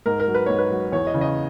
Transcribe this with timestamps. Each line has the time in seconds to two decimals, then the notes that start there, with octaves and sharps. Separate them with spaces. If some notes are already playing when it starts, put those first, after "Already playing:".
0.06 G#2 A#4
0.20 A#4
0.28 F#3
0.34 B4
0.46 G#2 C#5
0.59 B4
0.70 F#3
0.92 E2 C#5
1.07 D#5
1.14 C#3 E3
1.21 D#5